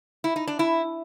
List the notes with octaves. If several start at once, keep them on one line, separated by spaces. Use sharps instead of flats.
E4
D#4
D4
E4